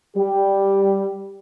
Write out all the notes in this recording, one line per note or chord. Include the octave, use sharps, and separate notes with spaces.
G3 G4